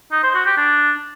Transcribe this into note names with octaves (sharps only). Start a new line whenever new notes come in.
D#4
C5
F#4
G4
D4